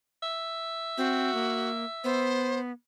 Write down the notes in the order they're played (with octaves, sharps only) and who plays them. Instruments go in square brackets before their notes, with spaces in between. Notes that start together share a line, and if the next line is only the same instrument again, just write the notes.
[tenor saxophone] E5
[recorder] C4 [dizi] F#4
[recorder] A#3
[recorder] B3 [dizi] C5